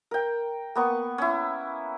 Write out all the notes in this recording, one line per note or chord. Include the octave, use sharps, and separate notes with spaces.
A#4 G5
A#3 B3 C#6
C#4 E4